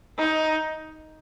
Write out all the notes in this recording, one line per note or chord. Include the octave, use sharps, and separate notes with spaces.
D#4